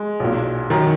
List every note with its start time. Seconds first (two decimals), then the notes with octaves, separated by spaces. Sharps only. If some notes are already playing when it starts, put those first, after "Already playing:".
Already playing: G#3
0.20 B1 A#2
0.70 F#2 D#3